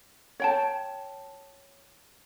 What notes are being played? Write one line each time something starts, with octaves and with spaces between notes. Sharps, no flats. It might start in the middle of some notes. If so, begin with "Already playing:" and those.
C#5 G5 A5